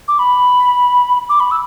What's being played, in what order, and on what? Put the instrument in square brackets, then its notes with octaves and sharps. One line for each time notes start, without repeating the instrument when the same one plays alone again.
[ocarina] D6
B5
D6
B5
E6